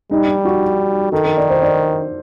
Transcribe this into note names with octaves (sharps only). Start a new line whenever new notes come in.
G3 D#4
D#4
F#4
D#3 A4
A#4
D5
C5
D5